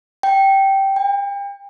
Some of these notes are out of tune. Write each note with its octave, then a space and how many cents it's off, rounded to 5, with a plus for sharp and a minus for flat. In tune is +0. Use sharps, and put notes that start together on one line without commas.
G5 -10
G5 +40